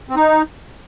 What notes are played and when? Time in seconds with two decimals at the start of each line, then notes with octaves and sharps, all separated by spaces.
0.09 C4
0.16 D#4